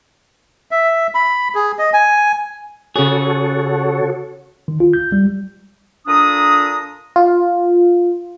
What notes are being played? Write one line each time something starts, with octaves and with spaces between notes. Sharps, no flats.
E5
B5
G#4
D#5
G#5
C#3 F#4 G#4 A4 C#5
D#3
F4
G6
G3
A#2 D4 A4 A#5 D#6
F4